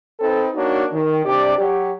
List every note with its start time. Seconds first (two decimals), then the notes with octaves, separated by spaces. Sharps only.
0.20 C4 D#4 A4 B4
0.54 A#3 D4 D#4 F#4 C#5
0.93 D#3
1.25 C3 D4 G4 D5
1.57 F#3 F#4 G4